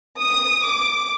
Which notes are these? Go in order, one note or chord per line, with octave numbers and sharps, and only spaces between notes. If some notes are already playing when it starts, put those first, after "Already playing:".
D#6
D6